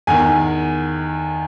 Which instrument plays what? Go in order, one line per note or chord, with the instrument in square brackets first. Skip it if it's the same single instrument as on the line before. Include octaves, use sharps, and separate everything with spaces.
[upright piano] E2 D#3 G#5